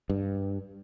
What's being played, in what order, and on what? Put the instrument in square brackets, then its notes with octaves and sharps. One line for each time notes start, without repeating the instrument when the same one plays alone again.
[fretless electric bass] G2